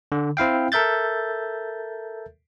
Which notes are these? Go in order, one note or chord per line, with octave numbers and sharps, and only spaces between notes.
D3
C4 E4 F5 G5
A4 A#4 E5 G6 A6